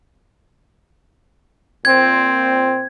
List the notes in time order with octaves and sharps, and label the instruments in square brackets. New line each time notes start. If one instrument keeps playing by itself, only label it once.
[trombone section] A#2 C4 [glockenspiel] G#6